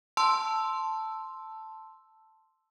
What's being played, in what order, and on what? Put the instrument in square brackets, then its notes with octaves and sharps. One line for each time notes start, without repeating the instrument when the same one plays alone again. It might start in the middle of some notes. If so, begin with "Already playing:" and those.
[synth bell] A5 C6 E6